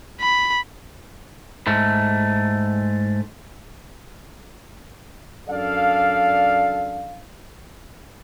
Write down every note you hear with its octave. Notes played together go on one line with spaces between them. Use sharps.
B5
G#2 A3
F#2 D4 A4 D5 F5